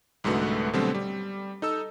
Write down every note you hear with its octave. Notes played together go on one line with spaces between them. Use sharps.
C2 G#2 D3 A3 F#4 B4
B2 D3 F#3 G3 A3 C4
G3
D#4 A4 E6